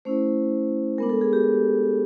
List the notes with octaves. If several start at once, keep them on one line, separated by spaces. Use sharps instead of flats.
A3 C#4 E4 C5
G#3 B3 D4 A#4
A4
G#4
G4